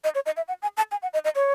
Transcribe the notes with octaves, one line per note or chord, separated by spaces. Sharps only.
D#5
C#5
D#5
E5
F#5
G#5
A5
G#5
F#5
D#5
D#5
C#5